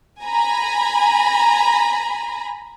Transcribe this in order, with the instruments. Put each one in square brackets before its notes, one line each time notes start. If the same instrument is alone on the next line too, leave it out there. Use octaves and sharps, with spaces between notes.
[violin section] G#5 A#5 B5